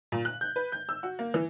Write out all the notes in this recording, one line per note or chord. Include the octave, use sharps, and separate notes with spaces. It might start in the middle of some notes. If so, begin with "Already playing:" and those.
A#2
F#6
G6
B4
G6
E6
F#4
A#3
E3